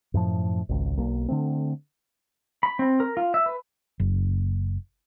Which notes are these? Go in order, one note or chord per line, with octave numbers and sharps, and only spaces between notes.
F#2 A2 F3
G#1 C#2
B1 A#3
D3 F3 A3 C4
B5
C4
A#4
F4
E5
B4
F#1